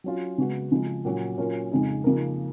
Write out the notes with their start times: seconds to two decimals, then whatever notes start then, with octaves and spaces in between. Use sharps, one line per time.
0.04 F#3 C#4 F4
0.38 C#3 G#3 B3 F#4
0.72 C#3 F3 G#3
1.05 A#2 F#3 C#4 F#4
1.38 A#2 F#3 C#4 F4 A#4
1.72 F2 C#3 G#3 D#4
2.04 C#3 F3 A#3 D#4 A#4